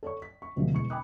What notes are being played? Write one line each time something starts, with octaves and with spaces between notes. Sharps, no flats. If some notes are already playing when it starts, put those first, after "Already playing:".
A4 C#5 D5 C#6
B6
C#6
D2 B2 D3 F3 G3 A3
E1 E3 G#3 C#6 C#7
G5 G#5 B5 D6 D#6 F#6